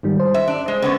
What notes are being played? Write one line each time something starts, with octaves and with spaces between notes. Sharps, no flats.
G#2 D#3 G3
C5
E5
D4
G#3
D3 B3 C#4